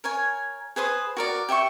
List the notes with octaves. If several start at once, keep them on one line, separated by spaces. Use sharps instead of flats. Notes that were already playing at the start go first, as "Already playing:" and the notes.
A#4 C#5 G#5
G#4 B4 C5 D#6
F#4 A#4 D5
G4 E5 G5 C#6